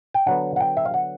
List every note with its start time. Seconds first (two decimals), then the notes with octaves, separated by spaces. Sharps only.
0.14 G5
0.26 D3 F#3 B3 F#5
0.56 F#5
0.61 G5
0.77 E5
0.85 F5
0.94 F#5